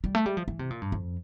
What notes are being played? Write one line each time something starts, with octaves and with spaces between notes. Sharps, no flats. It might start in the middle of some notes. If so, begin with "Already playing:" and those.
G3
A3
G3
F3
E3
C3
A#2
G2
F2